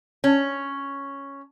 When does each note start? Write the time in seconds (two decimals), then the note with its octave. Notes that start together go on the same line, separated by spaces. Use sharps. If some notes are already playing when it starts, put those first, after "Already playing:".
0.24 C#4